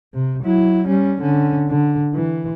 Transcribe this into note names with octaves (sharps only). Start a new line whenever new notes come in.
C3
F#3 E4
G3 C#4
D3 C#4
D3
E3